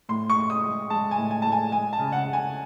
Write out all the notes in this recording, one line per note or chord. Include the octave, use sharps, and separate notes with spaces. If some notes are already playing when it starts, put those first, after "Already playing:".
A2 C6
C#6
A2
D#6
G#3
G#3 A5
G#5
A2
G#5
A2 A5
G#5
G#3 G#5
A5
C#3
F#5
C#3
G#5